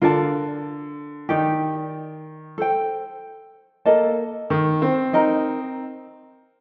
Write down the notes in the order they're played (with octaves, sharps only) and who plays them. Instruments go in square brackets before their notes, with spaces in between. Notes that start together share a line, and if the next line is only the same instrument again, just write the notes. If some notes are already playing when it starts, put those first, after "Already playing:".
[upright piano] D3 [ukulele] F4 A#4 D5 A5
[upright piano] D#3 [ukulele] D#4 G4 D5 G5
[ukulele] A4 C5 G5
[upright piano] A#3 [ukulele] A4 D#5 A5
[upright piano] D#3
C4
[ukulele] D#4 A#4 D#5 A#5